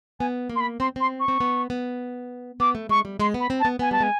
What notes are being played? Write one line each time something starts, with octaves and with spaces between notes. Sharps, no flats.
B3 G#5
A#3
C6
B5
C4 C6
C4 C6
C#6
C4
B3
B3
B3 D6
A3
G#3 C#6
G3
G#3 C6
B3
B5
C4
A5
B3
B3 G#5
G3 A5
G#3 G#5